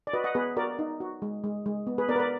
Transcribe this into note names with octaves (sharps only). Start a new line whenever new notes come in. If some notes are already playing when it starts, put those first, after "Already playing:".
D5
F#4 B4 D#5
D#5 F#5
B3 G#4 B4
F#4 A#4 D5
D#4
F#4
G#3
G#3
G#3
B3
G#4 B4
B3 A#4 D5
B4
A#4 D5